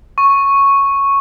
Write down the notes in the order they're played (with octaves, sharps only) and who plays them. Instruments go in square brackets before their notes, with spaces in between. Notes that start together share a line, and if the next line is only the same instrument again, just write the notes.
[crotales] C#6